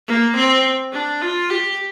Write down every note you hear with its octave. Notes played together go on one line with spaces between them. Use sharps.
A#3
C4
D4
F4
G4